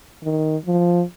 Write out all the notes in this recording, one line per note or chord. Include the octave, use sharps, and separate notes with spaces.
D#3
F3